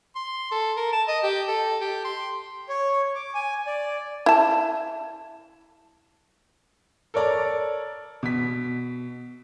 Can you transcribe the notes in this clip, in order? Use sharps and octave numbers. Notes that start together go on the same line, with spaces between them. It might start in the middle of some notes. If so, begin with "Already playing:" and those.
C6
A4
A#4
A5
D#5
G4
A4
G4
C6
C#5
D6
G#5
D5
E4 A5
A4 A#4 C#5 D5 A#5
B2 B6